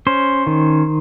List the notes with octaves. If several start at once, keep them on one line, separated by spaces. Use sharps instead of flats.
C#4 C5
D#3